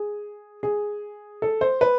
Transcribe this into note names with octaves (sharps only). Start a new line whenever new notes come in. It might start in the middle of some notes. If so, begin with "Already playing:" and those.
Already playing: G#4
G#4
A4
C5
B4